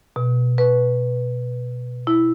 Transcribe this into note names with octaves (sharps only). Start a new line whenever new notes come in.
B2
B4
E4